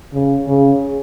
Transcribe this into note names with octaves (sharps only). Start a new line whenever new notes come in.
C#3
C#3